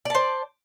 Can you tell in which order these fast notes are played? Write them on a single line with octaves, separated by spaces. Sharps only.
D5 A5 C5